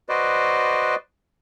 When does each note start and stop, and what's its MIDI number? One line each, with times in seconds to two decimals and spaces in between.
0.09 0.95 66
0.09 0.95 71
0.09 0.95 72
0.09 0.95 74
0.09 0.95 75